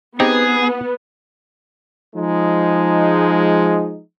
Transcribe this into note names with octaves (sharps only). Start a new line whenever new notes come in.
B3 C4 D#4 G4 G#4
F3 G#3 D#4